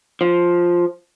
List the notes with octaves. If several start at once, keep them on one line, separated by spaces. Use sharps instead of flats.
F3